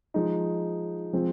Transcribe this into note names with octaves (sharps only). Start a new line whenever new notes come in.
F3 G#3 D#4
F3 G#3 C4